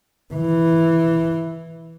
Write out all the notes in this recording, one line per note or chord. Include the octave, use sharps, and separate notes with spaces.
E3